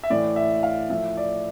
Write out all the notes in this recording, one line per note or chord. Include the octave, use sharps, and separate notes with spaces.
E5
A2 E3 D5
E5
F5
A2 F3 E5
D5